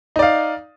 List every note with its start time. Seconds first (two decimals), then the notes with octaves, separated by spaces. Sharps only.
0.16 D#4
0.19 D5
0.23 F5